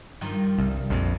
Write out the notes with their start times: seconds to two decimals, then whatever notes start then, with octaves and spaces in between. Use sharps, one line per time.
0.21 G2 D#3 F3
0.58 C2
0.90 A#1 F2